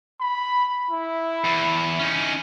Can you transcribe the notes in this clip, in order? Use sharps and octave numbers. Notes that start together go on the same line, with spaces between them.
B5
E4
E2
C#4 D#4